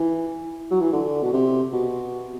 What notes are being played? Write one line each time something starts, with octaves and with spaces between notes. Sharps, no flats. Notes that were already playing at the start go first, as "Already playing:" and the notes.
Already playing: E3
F#3
E3
D3
B2
C3
B2